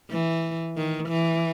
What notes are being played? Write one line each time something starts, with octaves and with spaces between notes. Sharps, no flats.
E3
D#3
E3